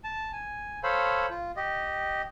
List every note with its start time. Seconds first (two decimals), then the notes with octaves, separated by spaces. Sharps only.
0.04 A5
0.32 G#5
0.83 A4 C5 C#5 F5 B5
1.30 F4
1.56 G4 D#5